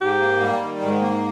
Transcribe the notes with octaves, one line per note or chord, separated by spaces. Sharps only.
G#2 G4
A#3
G3
D#3
G#2
A#3